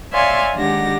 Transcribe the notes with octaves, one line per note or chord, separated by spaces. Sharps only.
C#5 D5 E5 F5 G#5 C6
D#3 G#3 D4 G4 F#5 A#6